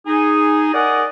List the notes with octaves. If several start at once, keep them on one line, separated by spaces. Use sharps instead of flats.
D#4 G#4
A#4 D5 D#5 F#5 G#5